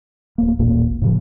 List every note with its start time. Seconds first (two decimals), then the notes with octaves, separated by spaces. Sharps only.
0.38 D1 A#3
0.59 D#1 A1 A#2 A#3
1.02 A2 C#3 F3